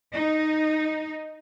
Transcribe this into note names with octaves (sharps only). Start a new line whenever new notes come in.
D#4